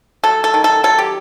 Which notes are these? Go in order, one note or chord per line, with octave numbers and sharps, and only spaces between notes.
F#3 A4
A4
D#3
A4
F#3 A4
G4